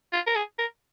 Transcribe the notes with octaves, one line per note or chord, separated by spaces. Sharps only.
F4
A#4
G#4
A#4